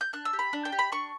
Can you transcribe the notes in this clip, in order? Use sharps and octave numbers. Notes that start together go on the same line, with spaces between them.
G6
D4 F#6
E6
G4
B5
D4
G5
G4
B5
D4 C#6